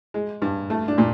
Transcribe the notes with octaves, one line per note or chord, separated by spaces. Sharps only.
G#3
G2
A3
D4
A#2